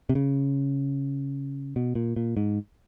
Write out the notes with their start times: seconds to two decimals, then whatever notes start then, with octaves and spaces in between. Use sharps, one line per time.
0.09 C3
0.15 C#3
1.76 B2
1.95 A#2
2.16 A#2
2.37 G#2